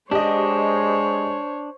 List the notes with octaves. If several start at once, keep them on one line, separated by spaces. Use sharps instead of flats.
G#3 D4 G4 C5 C#5 D#5